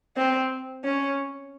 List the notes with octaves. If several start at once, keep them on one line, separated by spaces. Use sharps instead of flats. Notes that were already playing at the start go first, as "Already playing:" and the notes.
C4
C#4